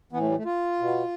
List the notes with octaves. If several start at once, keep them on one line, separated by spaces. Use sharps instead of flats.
A2 E3 A3 B3
G3
A3
F4
B2